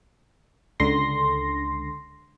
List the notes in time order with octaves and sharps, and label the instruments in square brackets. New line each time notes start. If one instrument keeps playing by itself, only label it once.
[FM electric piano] C#2 D3 C6 A#6